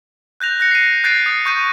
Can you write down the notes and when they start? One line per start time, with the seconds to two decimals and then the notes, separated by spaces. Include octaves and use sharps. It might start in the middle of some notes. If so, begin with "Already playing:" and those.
0.40 F#6 G6 A#6 F7
0.60 F#6 A#6 C#7
0.71 C7 D#7
1.04 F#6 G6 A6 C7 D7 D#7
1.26 D#6 C7
1.46 C#6 G6 D#7